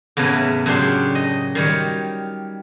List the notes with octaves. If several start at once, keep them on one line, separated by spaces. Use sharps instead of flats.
E2 A2 C#3 E3
F#2 C#3 D4 G4 C6
D#5
D#3 G3 C#5